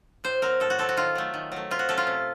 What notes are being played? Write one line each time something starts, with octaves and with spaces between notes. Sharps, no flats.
A2 C5
F#3 C4 A#4
A2 A4
F#4
F#3 C4 A4
F#4
D#3 F4
F#3 A3
D#3
F#3 A3
C3 F4
F#4
F#3 A3 C#4 A4
F4
C3